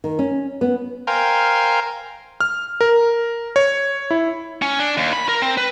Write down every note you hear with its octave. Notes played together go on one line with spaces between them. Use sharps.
D#3
C#4
B3
A#4 C5 F5 G5 G#5
F6
A#4
C#5
E4
C#4
D4
D#2
B5
A#4
C4
B4